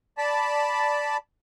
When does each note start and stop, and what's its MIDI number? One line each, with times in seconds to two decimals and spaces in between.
0.18 1.17 74
0.18 1.17 81
0.18 1.17 83